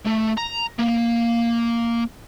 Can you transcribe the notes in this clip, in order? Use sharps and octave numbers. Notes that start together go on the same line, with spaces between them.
A3
A#5
A#3